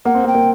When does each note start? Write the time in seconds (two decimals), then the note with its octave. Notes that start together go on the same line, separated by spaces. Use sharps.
0.05 A#3 F#5
0.15 C4
0.24 A#3
0.27 G5
0.35 A#3